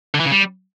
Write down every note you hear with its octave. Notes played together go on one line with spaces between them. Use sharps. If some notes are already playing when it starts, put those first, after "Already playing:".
D3
E3
C#3
G3